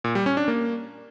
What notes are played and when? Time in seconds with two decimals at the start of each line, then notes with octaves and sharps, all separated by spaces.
0.04 A#2
0.15 G3
0.26 C#4
0.37 D4
0.48 A#3